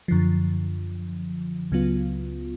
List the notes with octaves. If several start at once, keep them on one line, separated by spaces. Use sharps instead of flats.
F#2 D3 F3
C#2 C#3 F#3 B3 F4